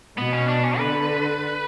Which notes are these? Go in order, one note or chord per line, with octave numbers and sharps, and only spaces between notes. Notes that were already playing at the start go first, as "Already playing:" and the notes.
B2 B3
C#4
D4
C#4
D3 B4